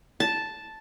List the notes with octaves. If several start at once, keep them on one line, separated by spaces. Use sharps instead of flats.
A5